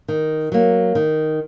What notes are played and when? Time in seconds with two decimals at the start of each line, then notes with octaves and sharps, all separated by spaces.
0.08 D#3
0.52 F#3 A#3
0.95 D#3